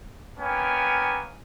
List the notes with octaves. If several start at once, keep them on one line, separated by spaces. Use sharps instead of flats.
A#3 B3 C#4 G5 G#5